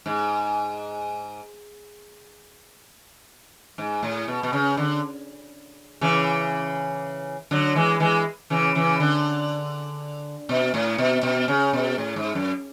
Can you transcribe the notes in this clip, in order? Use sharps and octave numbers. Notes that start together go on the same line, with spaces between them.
G#2
G#2
A2
B2
B2
C#3
D3
C#3 E3
D3 F#3
E3 G#3
E3 G#3
C#3 E3
C#3 E3
D3
B2
A2
B2
B2
C#3
B2
A2
G#2
F#2